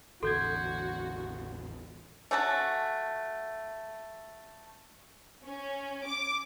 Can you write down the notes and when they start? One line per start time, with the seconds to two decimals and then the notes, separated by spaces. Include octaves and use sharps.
0.23 A1 E2 D3 F#4 A4 C6 G6 G#6
2.31 A3 C#4 F#4 A5
5.46 C#4
6.05 D6